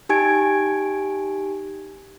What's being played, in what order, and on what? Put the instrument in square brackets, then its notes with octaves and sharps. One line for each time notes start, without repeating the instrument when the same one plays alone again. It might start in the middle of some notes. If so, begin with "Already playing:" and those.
[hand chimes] D#4 G4 G#5 G#6 D7